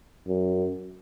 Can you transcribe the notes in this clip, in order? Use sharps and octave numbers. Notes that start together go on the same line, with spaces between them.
F#2